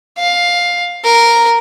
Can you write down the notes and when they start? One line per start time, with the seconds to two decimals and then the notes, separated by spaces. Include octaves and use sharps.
0.18 F5
1.05 A#4